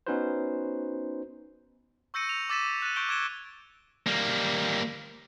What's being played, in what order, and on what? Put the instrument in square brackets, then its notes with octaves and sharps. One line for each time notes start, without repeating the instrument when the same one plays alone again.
[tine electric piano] B3 C#4 D#4 F#4 B4 C5
[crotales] C#6 E6 G6 A#6 C#7 D#7
F7
D6 E6 A6 B6 D#7 E7
F#6 A6 D#7
C#6 G6 D7 D#7 G7
D6 F#6 G#6 D7 E7 G7
[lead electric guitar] G3 A#3